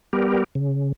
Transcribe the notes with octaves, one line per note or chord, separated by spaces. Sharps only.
G3 B3 G4 A#4
C#3